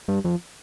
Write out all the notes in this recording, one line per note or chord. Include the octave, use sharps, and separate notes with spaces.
G2
F2